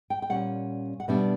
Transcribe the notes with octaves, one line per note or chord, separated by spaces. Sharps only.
G5
G5
A#2 G3 C#4 F#5
F#5
B2 G3 B3 D4 E5